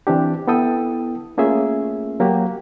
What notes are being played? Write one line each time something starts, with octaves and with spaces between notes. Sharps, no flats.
E3 C4 D4 G4
B3 E4 A4 G5 D#6
A3 A#3 C#4 F4 G#4 E5
F#3 A#3 F#4 G4